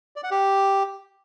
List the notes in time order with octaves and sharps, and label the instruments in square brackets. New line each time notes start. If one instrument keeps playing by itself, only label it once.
[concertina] D5
F#5
G4